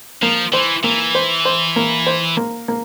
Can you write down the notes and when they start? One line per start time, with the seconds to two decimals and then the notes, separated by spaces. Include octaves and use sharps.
0.22 F3 A#3
0.53 E3 C5
0.84 E3 A#3
1.15 C5
1.45 C5
1.76 A#3
2.06 C5
2.37 A#3
2.68 A#3